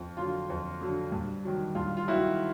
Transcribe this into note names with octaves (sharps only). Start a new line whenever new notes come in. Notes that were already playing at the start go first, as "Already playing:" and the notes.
Already playing: F2
D3 F#3 F4
F2
D3 F#3
G2
D#3 F#3
G2 F4
F4
D#3 F#3 E4 F#4